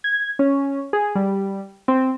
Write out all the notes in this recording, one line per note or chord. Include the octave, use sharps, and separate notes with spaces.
G#6
C#4
G#4
G3
C4